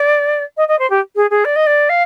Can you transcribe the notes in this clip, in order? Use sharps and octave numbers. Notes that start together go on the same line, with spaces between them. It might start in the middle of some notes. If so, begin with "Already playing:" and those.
Already playing: D5
D#5
D#5
C5
G4
G#4
G#4
D5
D#5
D5
F5